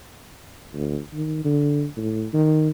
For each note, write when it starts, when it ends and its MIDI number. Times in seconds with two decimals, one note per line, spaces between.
0.74 0.99 38
1.14 1.40 51
1.45 1.85 50
1.97 2.26 45
2.33 2.69 51